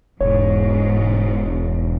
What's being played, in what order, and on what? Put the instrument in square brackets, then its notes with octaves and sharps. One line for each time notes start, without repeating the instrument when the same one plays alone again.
[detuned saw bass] E1 [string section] G#2 [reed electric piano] C#5